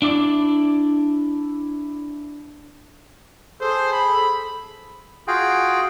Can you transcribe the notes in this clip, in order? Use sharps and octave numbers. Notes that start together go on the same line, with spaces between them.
D4 E4 D5
G#4 A4 C5
B5
F4 F#4 G#4 G5